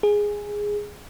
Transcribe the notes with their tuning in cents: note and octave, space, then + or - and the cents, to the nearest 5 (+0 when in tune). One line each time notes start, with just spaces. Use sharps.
G#4 -5